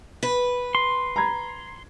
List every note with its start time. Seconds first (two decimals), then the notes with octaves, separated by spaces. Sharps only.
0.23 B4
0.75 C6
1.16 A#5 B5 G#6